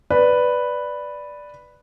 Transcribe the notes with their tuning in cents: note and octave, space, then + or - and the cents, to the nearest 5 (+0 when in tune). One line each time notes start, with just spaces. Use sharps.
B4 +0 D5 +0